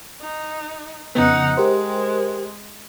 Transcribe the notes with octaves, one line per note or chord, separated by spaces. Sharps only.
D#4
F2 C#3 B3 D#4 F#5
G#3 G4 A#4 C5